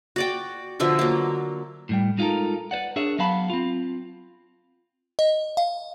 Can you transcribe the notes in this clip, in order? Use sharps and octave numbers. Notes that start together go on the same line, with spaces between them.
F#4 D5 G5
B2 D3 F3 E5
F#3 A#3
A2 G3 G5
G#3 D#4 F4 G4 A4 A#4
B4 C5 D5 F#5
D4 G#4 A#4 C#5 E5
F#3 B3 F5 A5 B5
C4 F4
D#5
F5